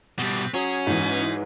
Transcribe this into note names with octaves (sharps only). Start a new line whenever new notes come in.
B2 G3 C4 G4 B4
F#3 C#4 G#4
G#2 E3 D#4 G#4 B4